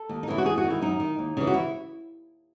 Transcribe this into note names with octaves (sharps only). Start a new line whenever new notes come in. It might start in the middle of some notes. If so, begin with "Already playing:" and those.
Already playing: A4
D#2
D#4
C#3 E3 E4
F#4
E2 G#4
F#4
D#3
E4
F#2 D#4
D#3
D#2
C#3 E3
F#4
E4